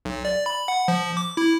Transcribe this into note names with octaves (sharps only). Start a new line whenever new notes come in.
B1
D5
B5
F#5
F3
D6
E4